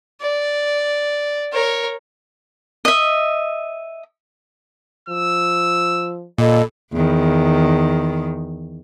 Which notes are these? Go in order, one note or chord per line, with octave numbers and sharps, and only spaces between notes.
D5
A#4 C#5
D#5 E5
F3 E6
A#2 A4 D#5 B5
E2 D#3